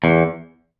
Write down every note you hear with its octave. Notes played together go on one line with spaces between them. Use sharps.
E2